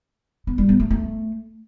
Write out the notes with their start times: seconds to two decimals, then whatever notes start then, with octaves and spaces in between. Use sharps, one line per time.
0.47 B3
0.58 G3
0.69 B3
0.80 A3
0.90 A3